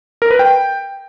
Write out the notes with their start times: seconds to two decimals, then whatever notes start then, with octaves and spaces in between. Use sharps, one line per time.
0.22 A#4
0.31 B4
0.39 G5